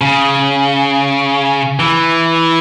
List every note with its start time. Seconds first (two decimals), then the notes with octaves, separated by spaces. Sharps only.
0.01 C#3
1.79 E3